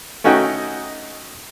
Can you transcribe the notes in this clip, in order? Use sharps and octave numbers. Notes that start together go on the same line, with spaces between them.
A3 C#4 D#4 F#4 D#5 G5